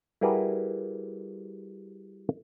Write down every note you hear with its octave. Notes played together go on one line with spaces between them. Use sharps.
G3 E4 F#4 G#4 A#4 B4